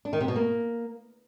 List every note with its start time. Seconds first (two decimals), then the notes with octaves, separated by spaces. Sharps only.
0.05 D4
0.13 D#3
0.20 C3
0.28 B2
0.36 A#3